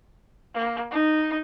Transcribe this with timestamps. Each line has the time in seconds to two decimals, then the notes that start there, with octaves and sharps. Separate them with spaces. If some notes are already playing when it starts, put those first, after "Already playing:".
0.54 A#3
0.91 D#4